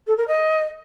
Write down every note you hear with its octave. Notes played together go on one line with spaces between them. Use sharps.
A4
A#4
D#5